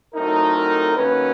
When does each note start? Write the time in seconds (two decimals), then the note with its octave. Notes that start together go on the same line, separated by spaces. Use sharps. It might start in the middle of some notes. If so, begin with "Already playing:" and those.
0.14 A2 F#3 A3 C4 D#4 A#4
0.56 A#4
0.97 D#3 F#3 A#3 C#4 B4